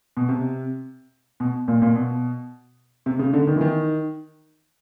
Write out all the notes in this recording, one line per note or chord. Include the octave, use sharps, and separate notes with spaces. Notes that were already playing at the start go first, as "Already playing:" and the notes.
B2
C3
B2
A#2
A#2
B2
C3
C#3
D3
D#3
E3
D#3